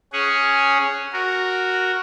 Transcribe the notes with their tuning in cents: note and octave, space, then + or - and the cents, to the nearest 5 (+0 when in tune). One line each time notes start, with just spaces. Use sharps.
C#4 +0 G#4 +0 F#5 +0
F#4 +0 A#4 +0